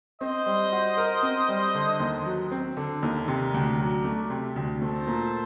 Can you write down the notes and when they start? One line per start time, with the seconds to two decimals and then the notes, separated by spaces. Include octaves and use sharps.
0.21 C4 C5 D#5
0.46 G3
0.72 F#4
0.97 A#4
1.23 C4
1.49 G3
1.75 D3
2.00 D#2
2.26 F#3
2.52 C4
2.77 D3
3.02 D#2
3.28 C3 A#4 D5
3.54 D2
3.79 F#3
4.04 A3
4.30 C3
4.56 D2
4.81 A3 A4 C5
5.06 A#2